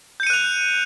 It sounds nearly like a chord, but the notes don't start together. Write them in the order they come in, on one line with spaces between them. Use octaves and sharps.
G6 C#7 D#7 F#6 F7